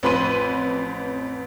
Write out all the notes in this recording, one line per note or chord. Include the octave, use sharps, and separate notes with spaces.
A1 F2 B4 B5 C6 D#7